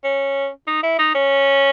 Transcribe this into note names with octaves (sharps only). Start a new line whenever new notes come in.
C#4
D#4
E4
D#4
C#4